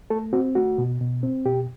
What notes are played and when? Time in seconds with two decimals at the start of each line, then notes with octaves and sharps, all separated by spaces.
0.10 A3 A4
0.33 C4 F#4
0.55 A3 F#4
0.78 B2
1.01 B2
1.23 C4
1.45 B2 G4